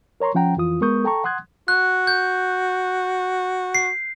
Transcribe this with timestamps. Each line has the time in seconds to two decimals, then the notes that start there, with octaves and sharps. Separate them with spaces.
0.20 A#4 C#5 A#5 C6 C#6
0.35 F3 C#4 F#5 G5 A#5
0.57 F2 E3 F4 D#6
0.81 G#3 B3 A#4 C#6 D#6 G6
1.04 A4 G5 A5 A#5 C#6
1.24 F#5 C6 D#6 F#6 G#6
1.68 F#4 F#6
2.07 G6
3.75 C7